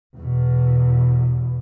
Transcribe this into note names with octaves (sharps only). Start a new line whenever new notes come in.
E2 B2